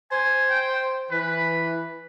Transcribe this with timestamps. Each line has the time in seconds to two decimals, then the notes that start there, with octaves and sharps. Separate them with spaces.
0.12 C5 G#5
0.50 G5
1.11 E3 B4